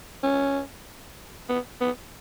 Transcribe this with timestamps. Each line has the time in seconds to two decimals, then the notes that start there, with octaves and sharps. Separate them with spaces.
0.23 C#4
1.49 B3
1.81 B3